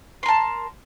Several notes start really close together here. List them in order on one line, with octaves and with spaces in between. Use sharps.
C6 A#4 A5